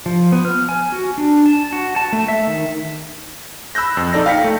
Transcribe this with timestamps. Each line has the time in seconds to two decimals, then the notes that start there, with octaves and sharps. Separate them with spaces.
0.06 F3
0.32 B3
0.45 F6
0.69 G#5
0.92 F#4
1.18 D4
1.46 A5
1.73 F#4
1.96 A5
2.13 A3
2.28 E5
2.47 D#3
3.75 B5 E6 F#6 G6 A#6
3.97 F2
4.13 A#1 D#4 A4 D5 A#6
4.26 F5 G5 A#6 B6 C#7
4.44 A3